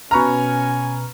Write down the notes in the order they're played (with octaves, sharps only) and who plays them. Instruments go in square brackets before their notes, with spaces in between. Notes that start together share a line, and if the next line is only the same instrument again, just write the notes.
[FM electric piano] B2 B4 F6 [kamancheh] C#4 G#5 [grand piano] A#5 C#6